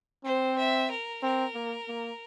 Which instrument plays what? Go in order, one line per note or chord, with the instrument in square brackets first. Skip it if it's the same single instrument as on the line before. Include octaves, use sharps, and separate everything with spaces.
[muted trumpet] C4 [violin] C5
[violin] E5
A#4
[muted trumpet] C4 [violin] A#4
[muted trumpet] A#3
A#3